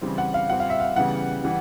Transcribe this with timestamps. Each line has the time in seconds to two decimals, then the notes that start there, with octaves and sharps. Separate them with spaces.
0.01 C#3 E3 G3 C4
0.18 F#5
0.34 F5
0.49 A#2 G3 C4 F#5
0.60 F5
0.70 E5
0.80 F5
0.96 C#3 E3 G3 B3 F#5
1.44 E3 G3